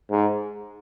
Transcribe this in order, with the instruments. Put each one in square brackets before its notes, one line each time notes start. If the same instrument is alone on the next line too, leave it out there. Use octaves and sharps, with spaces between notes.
[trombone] G#2